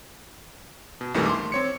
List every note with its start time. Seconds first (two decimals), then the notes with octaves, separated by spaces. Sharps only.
1.01 B2
1.14 A#1 F2 D#3 E3 G3 A3
1.26 C6 D6
1.52 C4 C#5 C#7